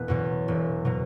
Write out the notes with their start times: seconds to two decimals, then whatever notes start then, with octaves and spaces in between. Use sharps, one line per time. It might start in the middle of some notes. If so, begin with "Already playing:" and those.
Already playing: E1 B3
0.08 E2 B2 F#3
0.48 E1
0.85 B2 F#3